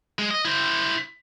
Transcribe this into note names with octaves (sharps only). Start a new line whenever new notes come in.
G#3
D#5
E4 C5